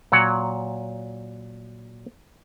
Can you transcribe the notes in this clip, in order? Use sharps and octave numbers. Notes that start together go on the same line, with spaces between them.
A#2 F#3 C#5 F#5